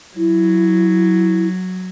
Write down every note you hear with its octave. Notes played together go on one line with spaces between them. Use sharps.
F#3 E4